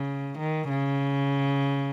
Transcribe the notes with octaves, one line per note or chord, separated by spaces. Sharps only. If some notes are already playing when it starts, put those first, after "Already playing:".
Already playing: C#3
D#3
C#3